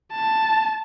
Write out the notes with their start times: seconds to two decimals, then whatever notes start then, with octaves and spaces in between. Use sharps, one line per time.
0.12 A5